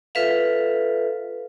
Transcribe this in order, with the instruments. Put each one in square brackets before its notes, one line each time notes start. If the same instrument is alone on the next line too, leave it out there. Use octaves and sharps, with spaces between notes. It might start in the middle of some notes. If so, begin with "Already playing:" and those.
[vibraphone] F4 A4 B4 E5 F5